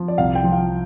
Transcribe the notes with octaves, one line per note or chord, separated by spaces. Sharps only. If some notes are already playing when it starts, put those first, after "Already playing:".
Already playing: F3
D5
C2 F5
G5
F3
F5